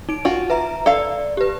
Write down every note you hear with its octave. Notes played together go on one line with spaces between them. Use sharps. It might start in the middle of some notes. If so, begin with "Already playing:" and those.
D#4 D7
F4 F#4
B4 E5 A#5
A4 D5 F5
G4 B4